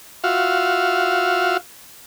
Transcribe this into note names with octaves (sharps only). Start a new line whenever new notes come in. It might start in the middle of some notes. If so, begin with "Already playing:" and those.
F4 F#4 E5 F5